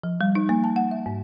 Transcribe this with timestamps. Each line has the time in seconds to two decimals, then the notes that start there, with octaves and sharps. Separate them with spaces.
0.03 F3
0.21 G3
0.35 D#4
0.49 A#3
0.64 A5
0.76 F#5
0.91 E5
1.06 G#2